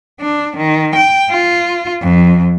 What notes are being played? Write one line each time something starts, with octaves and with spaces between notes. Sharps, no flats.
D4
D#3
G5
F4
F2